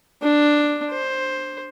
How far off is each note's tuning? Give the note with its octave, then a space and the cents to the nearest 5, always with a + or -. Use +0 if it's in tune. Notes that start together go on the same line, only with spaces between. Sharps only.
D4 +5
C5 +10